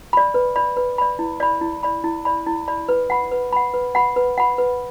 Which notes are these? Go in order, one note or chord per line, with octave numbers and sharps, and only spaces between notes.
D5 B5
B4
D5 B5
B4
D5 B5
E4
D5 B5
E4
D5 B5
E4
D5 B5
E4
D5 B5
B4
F#5 B5
B4
F#5 B5
B4
F#5 B5
B4
F#5 B5
B4